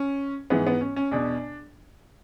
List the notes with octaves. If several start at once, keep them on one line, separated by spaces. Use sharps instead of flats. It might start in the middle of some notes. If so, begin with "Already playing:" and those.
Already playing: C#4
G#2 E3 B3
B3
C#4
C#4
E2 B2 D4